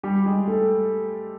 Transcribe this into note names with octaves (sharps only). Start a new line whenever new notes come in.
G3 G4
G#3 G#4
A3 A4